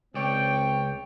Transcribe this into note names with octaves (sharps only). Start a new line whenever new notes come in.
C#2 C4 C#5 D5 G5